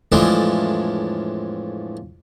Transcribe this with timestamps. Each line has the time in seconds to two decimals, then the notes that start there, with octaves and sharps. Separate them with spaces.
0.12 F2 A2 E3 F3 G#3 D4